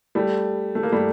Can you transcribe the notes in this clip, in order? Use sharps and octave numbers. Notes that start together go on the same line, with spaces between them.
G3 A3
A3
A#3
G3 A3